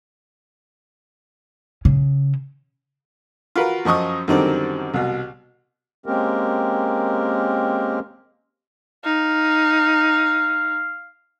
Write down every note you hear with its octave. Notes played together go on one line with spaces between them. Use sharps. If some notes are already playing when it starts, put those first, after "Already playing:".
C#3
F4 F#4 A#4 B4
F#2 F3 D#5 C#6 D#6
F#2 D3 D#3 G3 C4 D4
C2 B2
G#3 A#3 C4 C#4 G4 A#4
D#4 F5